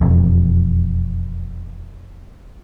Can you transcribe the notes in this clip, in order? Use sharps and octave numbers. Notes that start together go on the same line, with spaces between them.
E1 F2